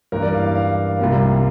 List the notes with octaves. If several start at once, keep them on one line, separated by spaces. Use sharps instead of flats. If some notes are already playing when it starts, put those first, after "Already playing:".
G2 E3 A#3 A#4
D5
F5
F5
F5
C2 A#2 G3 A#3